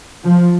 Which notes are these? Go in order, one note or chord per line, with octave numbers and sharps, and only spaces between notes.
F3